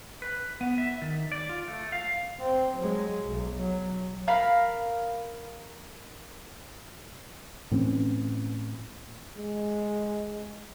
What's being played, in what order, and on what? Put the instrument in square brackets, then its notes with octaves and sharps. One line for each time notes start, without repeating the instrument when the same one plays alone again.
[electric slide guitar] B4
B3
E5
D#3
D5
F4
A3
F5
[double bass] C4
F#3 G#3
B1
F#3
[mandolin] A#4 F5 B5
[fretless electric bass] A2 E3 C4 C#4
[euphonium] G#3